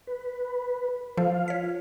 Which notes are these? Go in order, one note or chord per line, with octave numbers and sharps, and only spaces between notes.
B4
F3 F4 A4 C5 F5
C#5 B6